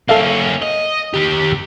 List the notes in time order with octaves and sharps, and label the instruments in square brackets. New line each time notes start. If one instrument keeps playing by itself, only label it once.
[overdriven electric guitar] A#3 C#4 [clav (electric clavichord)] A4 E5 F5
[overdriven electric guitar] D#5
D#3 G4